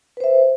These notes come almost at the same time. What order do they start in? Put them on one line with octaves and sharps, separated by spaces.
B4 C5 E5